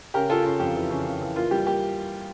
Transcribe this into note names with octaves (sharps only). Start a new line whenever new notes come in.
C#3 G4 A#4
C#3 F4 A4
C#3 F4
F2 G4
E3
C#3
C#3
E3
A#3 F4
G3 G4
A#3 G4